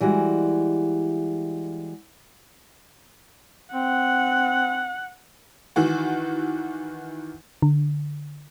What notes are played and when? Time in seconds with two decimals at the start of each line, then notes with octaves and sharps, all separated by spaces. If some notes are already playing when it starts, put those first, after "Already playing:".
0.01 E3 G3 G#3 F#4
3.74 C4 F#5
5.76 D#3 E3 F#4
7.62 D3